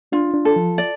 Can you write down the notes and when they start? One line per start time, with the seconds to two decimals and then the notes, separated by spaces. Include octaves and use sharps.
0.12 D4 F4
0.34 D4
0.45 A4
0.56 F3
0.78 D5